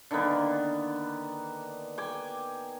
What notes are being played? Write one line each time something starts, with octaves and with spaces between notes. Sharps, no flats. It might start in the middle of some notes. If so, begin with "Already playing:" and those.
D3 D#3 A#3 B3
G5 G#5 D6